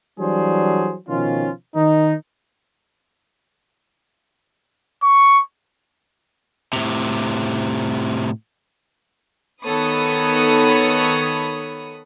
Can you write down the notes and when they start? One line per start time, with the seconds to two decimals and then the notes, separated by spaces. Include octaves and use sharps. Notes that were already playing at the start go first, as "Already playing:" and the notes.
0.19 E3 F#3 G3 D4 G#4 C5
1.08 B2 D#3 F3 C#4 F4
1.75 D#3 D#4
5.03 C#6
6.73 A2 C3
9.63 D#3 B3 A4 C#5 B5 D#6